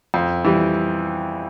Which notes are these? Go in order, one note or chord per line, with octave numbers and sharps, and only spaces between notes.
F2
E3 G3